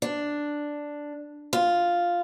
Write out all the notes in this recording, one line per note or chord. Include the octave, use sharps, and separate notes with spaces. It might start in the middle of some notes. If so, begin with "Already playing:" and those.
D4
F4